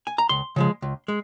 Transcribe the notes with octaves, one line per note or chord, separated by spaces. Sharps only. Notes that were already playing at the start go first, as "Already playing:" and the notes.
G#5
A#5
C#2 C6
C#3 F3 G#3
C#2
G#3